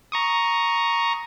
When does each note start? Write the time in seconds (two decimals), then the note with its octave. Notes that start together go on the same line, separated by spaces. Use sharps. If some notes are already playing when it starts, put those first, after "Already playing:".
0.12 A#5 C#6 D#6